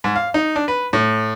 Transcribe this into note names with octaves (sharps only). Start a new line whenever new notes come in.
G#2
F5
D#4
D4
B4
A2